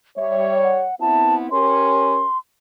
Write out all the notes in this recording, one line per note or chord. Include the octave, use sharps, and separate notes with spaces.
G3 C#5 E5
F#5
B3 C4 E4 A5
C#4 G4 A#4 C6